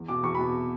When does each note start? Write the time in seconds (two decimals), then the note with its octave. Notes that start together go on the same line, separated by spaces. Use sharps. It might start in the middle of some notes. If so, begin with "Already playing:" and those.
Already playing: E2
0.08 B2 D6
0.23 E2 C#6
0.35 B5
0.39 B2